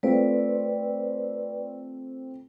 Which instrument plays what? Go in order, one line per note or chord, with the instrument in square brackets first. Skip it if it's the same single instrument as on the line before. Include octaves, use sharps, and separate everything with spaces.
[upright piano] A3 C4 F4 [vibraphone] B4 D5